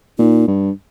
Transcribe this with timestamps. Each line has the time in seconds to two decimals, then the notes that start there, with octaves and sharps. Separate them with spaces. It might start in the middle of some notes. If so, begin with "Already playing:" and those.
0.19 A#2 D#4
0.47 G2